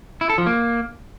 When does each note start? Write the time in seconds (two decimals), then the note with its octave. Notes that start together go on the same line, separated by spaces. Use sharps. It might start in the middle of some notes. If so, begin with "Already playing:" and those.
0.21 E4
0.30 A4
0.38 F3
0.46 A#3